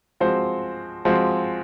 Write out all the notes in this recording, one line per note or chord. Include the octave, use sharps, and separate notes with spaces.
F3 G#3 C4 F#4 C5
F3 G#3 C4 F#4 C5